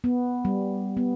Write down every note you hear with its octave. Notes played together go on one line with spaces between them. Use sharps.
B3
G3
B3